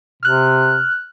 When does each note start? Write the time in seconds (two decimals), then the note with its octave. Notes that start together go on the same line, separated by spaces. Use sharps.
0.23 C3 F6 F#6